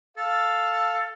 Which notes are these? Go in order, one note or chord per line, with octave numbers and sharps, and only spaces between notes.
A4 F5